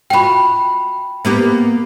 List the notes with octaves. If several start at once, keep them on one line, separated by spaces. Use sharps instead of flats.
F4 F#4 G5 B5
A#3 B3 G4